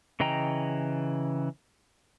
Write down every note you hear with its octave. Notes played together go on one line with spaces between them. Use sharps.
C#3 E3 D#5 G5 A#5